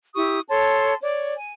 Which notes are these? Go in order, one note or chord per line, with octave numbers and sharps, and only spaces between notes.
E4 G4 C#6 D#6
A4 C#5 A5 C6
C#5 D5
G#5